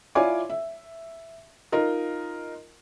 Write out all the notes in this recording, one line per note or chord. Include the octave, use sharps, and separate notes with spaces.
E4 F4 C#5 D5 G#5 D6
E5
D#4 F4 A#4 D#5